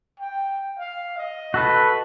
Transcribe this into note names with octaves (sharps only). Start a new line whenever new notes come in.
G5
F5
D#5
F#4 A4 B4